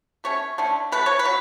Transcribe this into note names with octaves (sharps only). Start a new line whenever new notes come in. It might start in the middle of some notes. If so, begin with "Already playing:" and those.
B2 A3 C#4 C#5
D3 A3 C#4
B2 A3 C#4 B4
C#5
B4
F#3